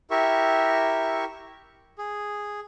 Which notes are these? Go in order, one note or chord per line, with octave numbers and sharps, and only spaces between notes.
E4 G4 A#4 E5 C#6
G#4